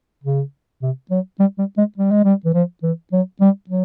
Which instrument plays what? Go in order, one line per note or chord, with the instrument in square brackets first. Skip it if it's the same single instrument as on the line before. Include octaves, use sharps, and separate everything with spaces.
[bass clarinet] C#3
C3
F#3
G3
G3
G#3
G3
G#3
G3
E3
F3
E3
F#3
G3
F#3